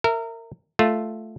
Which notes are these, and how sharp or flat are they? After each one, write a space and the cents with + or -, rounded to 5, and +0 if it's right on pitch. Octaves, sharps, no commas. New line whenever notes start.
A#4 -25 E5 +0
A3 -5 F4 +0